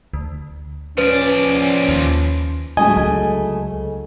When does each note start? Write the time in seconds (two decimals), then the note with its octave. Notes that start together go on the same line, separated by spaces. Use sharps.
0.14 D2
0.98 F3 C#4 B4 D5
1.89 D#2
2.77 D2 F#3 G#3 A3 D#5 G#5
2.96 C#2